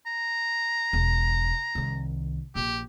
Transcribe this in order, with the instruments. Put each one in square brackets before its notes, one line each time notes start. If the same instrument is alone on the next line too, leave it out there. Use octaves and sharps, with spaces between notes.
[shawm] A#5
[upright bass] E1
C2 D#3
[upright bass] A#1 F3 [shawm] G4